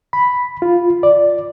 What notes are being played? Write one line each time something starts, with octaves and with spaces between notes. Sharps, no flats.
B5
F4
D5